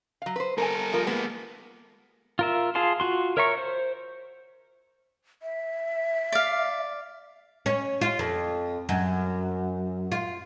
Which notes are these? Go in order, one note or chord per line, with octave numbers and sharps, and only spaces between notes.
F#3 F5
B4 C5
G3 A4 A#4 G#5
F3 F4 A#4
G#3 A#3 B3
F4 A#4 E5
F4 G#4 F5 A5 C6
F4 F#4 C6
A#4 C#5 E5 A#5 C#6
C5
E5
D5 F5
C#4
F4
F2
F#2
F4